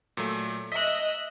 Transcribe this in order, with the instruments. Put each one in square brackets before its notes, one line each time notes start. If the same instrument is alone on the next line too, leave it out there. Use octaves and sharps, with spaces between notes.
[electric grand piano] A#2 F#3 A3
[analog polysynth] D#5 [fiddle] E5 F#6 [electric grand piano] B6